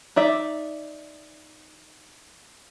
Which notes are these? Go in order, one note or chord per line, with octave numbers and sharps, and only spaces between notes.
D#4 D5 E5